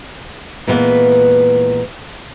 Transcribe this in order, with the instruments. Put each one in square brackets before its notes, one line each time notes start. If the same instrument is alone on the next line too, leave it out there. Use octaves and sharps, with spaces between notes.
[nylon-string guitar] A#2 E3 G#3 B3